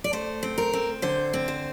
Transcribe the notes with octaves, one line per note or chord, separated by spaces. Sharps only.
D5
A3 C5
C4
A#4
C4
D3 C5
C4
C5